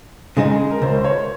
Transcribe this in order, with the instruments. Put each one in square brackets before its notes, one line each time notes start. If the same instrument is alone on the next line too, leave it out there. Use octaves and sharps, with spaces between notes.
[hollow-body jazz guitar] C#3 G#3 D#4
[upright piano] A#4
[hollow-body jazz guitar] C#2 [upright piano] C5
[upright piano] C5
C#5